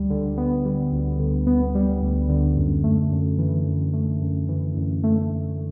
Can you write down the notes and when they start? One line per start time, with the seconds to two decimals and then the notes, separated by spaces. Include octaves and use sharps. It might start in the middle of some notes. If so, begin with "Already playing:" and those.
Already playing: D2 G3
0.10 D3
0.37 B3
0.65 G3
0.92 D2
1.19 D3
1.47 B3
1.75 G3
2.02 D2
2.29 D3
2.57 F#2
2.84 A3
3.11 F#2
3.38 E3
3.66 F#2
3.93 A3
4.21 F#2
4.49 E3
4.76 F#2
5.04 A3
5.31 F#2